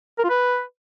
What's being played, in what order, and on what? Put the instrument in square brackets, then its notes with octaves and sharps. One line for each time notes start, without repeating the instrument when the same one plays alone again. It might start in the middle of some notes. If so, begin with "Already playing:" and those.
[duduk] A#4
F4
B4